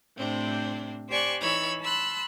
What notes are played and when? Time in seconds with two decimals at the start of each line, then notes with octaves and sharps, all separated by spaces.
0.17 A2 C3 C4 D4
1.09 G4 C5 D5 G#5 C#6 F#6
1.41 E3 D#4 C#5 B5 E6
1.81 A5 B5 C6 E6 F#6